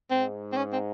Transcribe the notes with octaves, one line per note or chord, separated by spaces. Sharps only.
G#2 C4
C4
C#4
C4